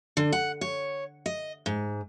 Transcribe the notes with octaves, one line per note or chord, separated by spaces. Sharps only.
D3
F#5
C#5
D#5
G#2